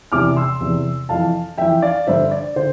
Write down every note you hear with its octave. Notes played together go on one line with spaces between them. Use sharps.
E2 C3 E3 D6 F6
C6 E6
E2 C3 E3
F2 E3 F5 A5
F2 E3 E5 G5
D5 F5
G2 D3 C5 E5
D5
D3 C5